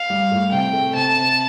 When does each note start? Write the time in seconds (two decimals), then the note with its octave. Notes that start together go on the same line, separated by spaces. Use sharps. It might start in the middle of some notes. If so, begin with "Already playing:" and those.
Already playing: F5
0.10 G3
0.31 A2
0.52 C3 G5
0.73 A3
0.94 C3 A5
1.15 C3